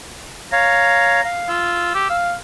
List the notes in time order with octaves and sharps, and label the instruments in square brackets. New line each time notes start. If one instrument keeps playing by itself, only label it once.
[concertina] C#5 F5 [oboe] A#5
[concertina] F5
[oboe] F4 [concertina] E6
[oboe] G4
F5